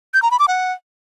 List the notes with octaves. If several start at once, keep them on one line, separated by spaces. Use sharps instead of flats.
G6
A#5
B5
D6
F#5